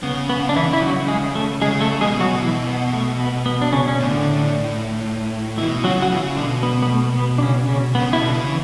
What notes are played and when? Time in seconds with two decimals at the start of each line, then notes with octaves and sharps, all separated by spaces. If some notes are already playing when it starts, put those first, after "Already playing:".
0.03 C#3 B3
0.29 B3
0.49 D4
0.56 E3 E4
0.73 E4
0.81 F#3 F#4
1.08 G#3 G#4
1.35 A3 A4
1.61 C#3 G#3 G#4
1.81 A3 A4
2.01 B2 G#3 G#4
2.20 F#3 F#4
2.40 E3 E4
2.67 B3
2.93 A3
3.20 B3
3.46 B3
3.62 D4
3.72 C#3 C#4
3.88 C#4
3.99 A2 D3 D4
5.57 B2 E3 E4
5.84 C#3 F#3 F#4
6.02 F#4
6.10 C#3 E3 E4
6.36 B2 D3 D4
6.63 B3
6.82 B3
6.89 A3
7.16 B3
7.38 D4
7.42 C#3 C#4
7.68 C#3 C#4
7.95 C#3 B3
8.13 B2 E4
8.21 D3 D4
8.35 C#3
8.49 E3